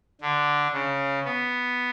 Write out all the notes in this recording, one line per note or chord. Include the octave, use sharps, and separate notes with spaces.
D3
C#3
B3